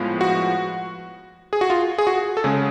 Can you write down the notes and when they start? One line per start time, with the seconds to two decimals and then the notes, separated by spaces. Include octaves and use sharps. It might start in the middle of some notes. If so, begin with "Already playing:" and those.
Already playing: A2 F3 G#3 B3
0.21 F#4
1.53 G#4
1.61 F#4
1.70 F4
1.98 G#4
2.07 F#4
2.37 A4
2.44 C#3 G#3 C#4 G#4